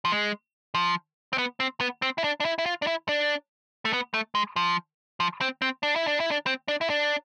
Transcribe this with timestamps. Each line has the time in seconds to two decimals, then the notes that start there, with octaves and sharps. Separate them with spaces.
0.05 F3
0.12 G#3
0.74 F3
1.33 C4
1.38 B3
1.60 C4
1.80 B3
2.02 C4
2.18 E4
2.24 D4
2.40 D4
2.45 E4
2.58 E4
2.66 F4
2.82 D4
2.87 E4
3.09 D4
3.85 A3
3.93 B3
4.14 A3
4.35 G#3
4.56 F3
5.20 F3
5.41 C4
5.62 C4
5.83 D4
5.96 E4
6.07 D4
6.20 E4
6.31 D4
6.46 C4
6.68 D4
6.81 E4
6.90 D4